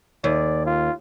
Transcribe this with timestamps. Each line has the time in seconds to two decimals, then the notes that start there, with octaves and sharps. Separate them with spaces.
0.24 D#2 D5
0.66 F4